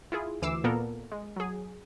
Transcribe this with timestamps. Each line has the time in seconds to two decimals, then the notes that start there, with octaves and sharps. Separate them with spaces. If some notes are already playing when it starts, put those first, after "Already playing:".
0.12 E4 F4 G#4
0.42 D2 E3 D6 E6 C7 E7
0.64 A#2 A#3 B3 A4 A#4
1.12 G#3
1.36 F#3 G#4